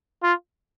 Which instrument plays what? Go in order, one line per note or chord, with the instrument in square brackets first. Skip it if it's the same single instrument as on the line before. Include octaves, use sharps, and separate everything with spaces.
[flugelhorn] F4